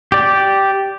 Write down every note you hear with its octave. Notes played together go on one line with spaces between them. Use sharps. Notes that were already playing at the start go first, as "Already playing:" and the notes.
G4 D5